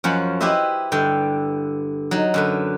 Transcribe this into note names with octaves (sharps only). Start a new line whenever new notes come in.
F#2 F3 C#4 F#5
E4 G4 B4 C5 D#5 E5
G2 D3 G5
F#3 D#4
F#2 D3 B4